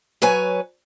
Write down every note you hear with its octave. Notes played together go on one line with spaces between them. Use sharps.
F#3 B4 C#5 G#5